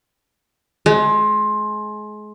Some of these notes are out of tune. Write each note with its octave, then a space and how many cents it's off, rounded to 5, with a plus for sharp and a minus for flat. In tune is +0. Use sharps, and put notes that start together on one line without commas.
G#3 +30